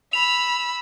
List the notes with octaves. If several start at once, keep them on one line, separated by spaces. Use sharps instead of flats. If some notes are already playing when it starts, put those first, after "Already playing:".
B5 E6 F7